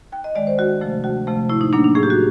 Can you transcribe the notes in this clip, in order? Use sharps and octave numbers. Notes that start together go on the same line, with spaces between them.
D#2 G5
D#5
D#3 G#3 D5
C5
D2 F#4
C3 F3 A3
D2 F#4
C3 F3 A3
A2 E4
D#4
F#3 A#3 D4
D4
A2 G#4
G4
F#4